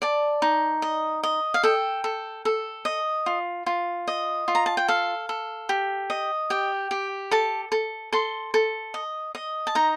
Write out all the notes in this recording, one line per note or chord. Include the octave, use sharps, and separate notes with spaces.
D5 A5
D#4
D#5
D#5
F5
A4 G5
A4
A4
D#5
F4
F4
D#5
F4
A#5
A5
G5
A4 F5
A4
G4
D#5
G4 G5
G4
A4 A5
A4
A4 C6
A4
D#5
D#5
A5
D#4 A#5